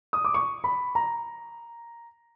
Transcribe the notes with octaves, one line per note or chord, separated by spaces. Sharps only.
D#6
D6
C#6
B5
A#5